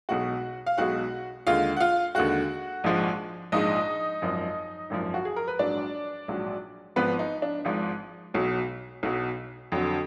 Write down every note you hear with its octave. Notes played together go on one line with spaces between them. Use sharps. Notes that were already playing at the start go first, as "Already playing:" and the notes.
B1 B2 G#3 F#4 F#5
F5
B1 B2 G#3 F#4 F#5
D#2 D3 G#3 F4 F5
F#5
F4 F5
D#2 D3 G#3 F#4 F#5
A#1 G#2 F3 G#3
A#1 G#2 F3 G#3 D#4 D#5
G#1 F#2 F3
G#1 F#2 F3
F#4
G#4
A#4
B4
A#1 G#2 F#3 D4 D5
A#1 G#2 F#3
G#1 G#2 F3 B3 B4
D#4
D4
G#1 G#2 F3
B1 B2 F#3
B1 B2 F#3
F2 D3 F#3